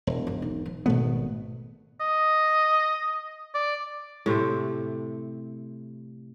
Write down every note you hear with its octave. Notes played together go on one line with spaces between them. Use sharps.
E1
G1 C2
B1 D#4
E3
G#1 B2 A3 B3
D#5
D5
A2 C3 A3 C4